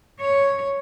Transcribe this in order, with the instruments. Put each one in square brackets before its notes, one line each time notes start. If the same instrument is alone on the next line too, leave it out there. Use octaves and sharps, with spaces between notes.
[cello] C#5